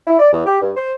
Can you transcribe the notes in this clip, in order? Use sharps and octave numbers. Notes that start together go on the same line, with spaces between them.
E4
D5
E2
G4
G2
C5